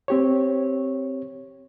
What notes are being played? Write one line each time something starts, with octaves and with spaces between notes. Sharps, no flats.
C4 G4 C#5